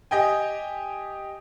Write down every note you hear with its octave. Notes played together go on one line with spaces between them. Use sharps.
G4 D#5 G5 G#5